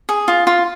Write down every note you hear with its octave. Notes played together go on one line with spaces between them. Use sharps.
G#4
F4
F4